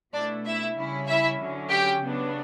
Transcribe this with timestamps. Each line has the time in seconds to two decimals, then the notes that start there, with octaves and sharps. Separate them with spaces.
0.13 B2 A3 D4 E4 D5
0.45 E4 E5
0.76 C#3 G3 C#4 E4
1.06 E4 E5
1.38 D3 F#3 C#4
1.69 G4 G5
2.00 C#3 F#3 B3 D4